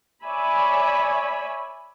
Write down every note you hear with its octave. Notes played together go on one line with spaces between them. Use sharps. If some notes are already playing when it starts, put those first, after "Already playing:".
C#5 D5 E5 G#5 B5